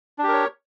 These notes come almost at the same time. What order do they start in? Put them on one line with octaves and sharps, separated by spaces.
D4 G4 A#4 C#5